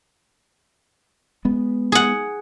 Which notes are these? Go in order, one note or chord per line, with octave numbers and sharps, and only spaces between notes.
G#3 B3
G#4 F#5